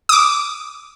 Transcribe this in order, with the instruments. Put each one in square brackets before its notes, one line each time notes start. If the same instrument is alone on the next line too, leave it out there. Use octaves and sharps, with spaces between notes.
[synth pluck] D6 D#6